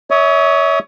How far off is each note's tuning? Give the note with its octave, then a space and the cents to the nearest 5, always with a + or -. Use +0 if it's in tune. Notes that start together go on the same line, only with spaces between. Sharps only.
C#5 +25 E5 -30 D#6 +0